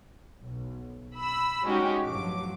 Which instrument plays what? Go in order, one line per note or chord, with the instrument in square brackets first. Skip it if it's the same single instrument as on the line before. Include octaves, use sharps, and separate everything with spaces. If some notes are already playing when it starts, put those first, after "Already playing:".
[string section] B1
B5 E6
G3 G#3 C#4 D#4 F#4 G4
A1 G2 F3 F#3 D6